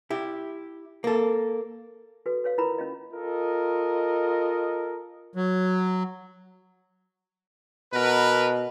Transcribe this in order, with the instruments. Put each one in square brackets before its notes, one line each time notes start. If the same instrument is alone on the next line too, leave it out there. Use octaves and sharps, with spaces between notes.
[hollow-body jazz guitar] E4 G4
A#3 A4
[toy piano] F#4 A4 B4
B4 C#5 F5
E4 F4 A#4 B4 A#5 B5
C#4 F4 D#5
[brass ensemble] F4 A4 A#4 D#5
[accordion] F#3
[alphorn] B2 [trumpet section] A#4 B4